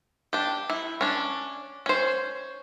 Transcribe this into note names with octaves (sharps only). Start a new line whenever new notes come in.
D4 G4
E4
C#4 D4
C#4 C5